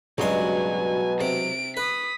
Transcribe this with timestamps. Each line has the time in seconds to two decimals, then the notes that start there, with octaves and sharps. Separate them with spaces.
0.18 C#2 G2 B2 F#3 G#3 G#5 C6
1.21 C3 D7
1.77 B4 D#6 B6